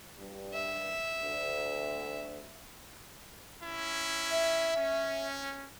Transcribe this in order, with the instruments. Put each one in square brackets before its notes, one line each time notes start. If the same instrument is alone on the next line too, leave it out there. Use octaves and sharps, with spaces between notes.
[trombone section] G2
[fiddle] E5
[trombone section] D2
[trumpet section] C#4 E4
[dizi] E5
[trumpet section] C#4